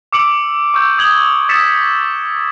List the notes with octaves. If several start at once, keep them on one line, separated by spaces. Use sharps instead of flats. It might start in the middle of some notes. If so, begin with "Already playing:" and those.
D6 E6 C#7 D7 F#7
C#6 E6 G6
D#6 G#6 F#7 G7
D#6 E6 A6 B6 C#7 E7